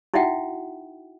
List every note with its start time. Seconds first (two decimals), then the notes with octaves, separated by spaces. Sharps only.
0.14 D#4 E4 F#4 E5 F#5 G5